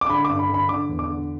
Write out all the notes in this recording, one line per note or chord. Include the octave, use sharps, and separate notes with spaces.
D6
D3 B5
G2 D6
B5
D3
B5
D3 D6
E2
D6
D3